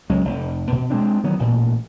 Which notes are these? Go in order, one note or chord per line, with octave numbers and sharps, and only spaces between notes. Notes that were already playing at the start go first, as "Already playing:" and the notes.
C#2 F#3 G#3 C#4
F1
B2
G#3 B3 C4 D4
D#3 E3 F#3 B3
A1 A#2